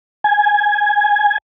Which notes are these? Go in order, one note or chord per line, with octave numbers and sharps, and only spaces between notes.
G#5